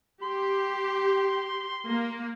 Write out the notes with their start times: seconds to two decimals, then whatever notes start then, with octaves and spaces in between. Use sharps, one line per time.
0.23 G4 C6
1.87 A#3